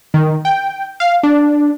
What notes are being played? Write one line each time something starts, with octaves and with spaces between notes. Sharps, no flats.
D#3
G5
F5
D4